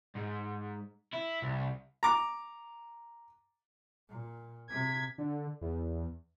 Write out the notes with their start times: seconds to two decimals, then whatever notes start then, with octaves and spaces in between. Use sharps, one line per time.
0.16 G#2
1.14 E4
1.42 C2
2.03 A#5 D6
4.09 A#2
4.69 C3 G#6 B6
5.18 D3
5.61 E2